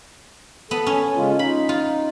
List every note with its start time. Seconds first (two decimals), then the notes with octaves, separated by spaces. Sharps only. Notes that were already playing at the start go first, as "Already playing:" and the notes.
0.71 B3 A4
0.86 C#4
1.16 C#3 G#3 F4
1.39 D#4 B5
1.69 F4